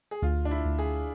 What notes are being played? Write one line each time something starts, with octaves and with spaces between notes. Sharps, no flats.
G#4
D2 F4
D4
E4
D2
G#4